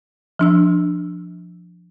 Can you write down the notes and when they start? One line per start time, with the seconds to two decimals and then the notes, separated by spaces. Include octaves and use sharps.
0.39 F3 D4 E6